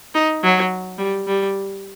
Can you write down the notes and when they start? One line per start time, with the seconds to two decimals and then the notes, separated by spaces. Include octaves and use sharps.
0.15 D#4
0.43 F#3
0.99 G3
1.27 G3